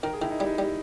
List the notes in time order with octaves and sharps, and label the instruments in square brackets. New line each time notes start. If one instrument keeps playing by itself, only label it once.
[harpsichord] D#3 [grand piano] A#4
[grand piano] G#4
[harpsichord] D#3 [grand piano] E4
[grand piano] D#4
[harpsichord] G3 [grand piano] E4
[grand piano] D#4
[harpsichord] G3